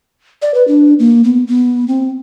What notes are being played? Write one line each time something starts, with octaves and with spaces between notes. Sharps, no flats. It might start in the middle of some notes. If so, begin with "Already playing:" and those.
D5
B4
D4
A#3
B3
B3
C4